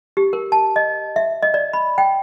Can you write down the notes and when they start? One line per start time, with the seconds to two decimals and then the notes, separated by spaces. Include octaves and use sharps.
0.17 G4
0.33 A#4
0.52 A5
0.76 D#5
1.16 E5
1.42 D#5
1.54 D5
1.73 B5
1.98 G5